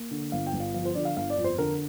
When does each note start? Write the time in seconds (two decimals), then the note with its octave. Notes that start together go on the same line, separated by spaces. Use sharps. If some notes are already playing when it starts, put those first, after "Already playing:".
Already playing: A#3
0.11 D3
0.32 G1 F5
0.47 G5
0.53 G1
0.60 F5
0.74 F3 F5
0.85 C5
0.95 D3 D5
1.05 F5
1.17 G1 F5
1.30 D5
1.37 F2
1.44 C5
1.58 D3 A#4